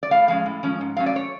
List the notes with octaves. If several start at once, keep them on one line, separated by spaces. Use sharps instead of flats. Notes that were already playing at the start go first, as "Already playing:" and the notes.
D5
A2 F5
F3 G#3 C#4 F5
A2
F3 G#3 C#4
G#2
F#3 A3 C#4 F5
D5
C#5